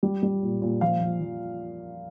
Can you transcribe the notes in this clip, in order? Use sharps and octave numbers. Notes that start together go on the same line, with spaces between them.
G3
G3
A#2
A#2
F3 F5
F3
F3